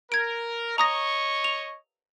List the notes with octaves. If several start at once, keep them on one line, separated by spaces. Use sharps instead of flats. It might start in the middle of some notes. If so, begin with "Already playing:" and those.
A#4 G#6 D7
C#5 D#5 A#5 C#6 D#6 A#6
F7